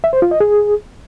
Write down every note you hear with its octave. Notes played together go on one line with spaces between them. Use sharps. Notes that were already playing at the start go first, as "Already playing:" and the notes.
E5
C5
F4
D#5
G#4